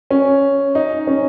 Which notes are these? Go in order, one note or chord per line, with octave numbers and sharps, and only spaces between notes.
C#4
D#4
C#4